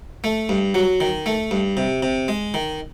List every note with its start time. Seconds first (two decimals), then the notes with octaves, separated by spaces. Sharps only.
0.24 A3
0.49 G2
0.74 F#3
1.00 D#3
1.26 A3
1.51 G2
1.77 C3
2.03 C3
2.28 G#3
2.54 D#3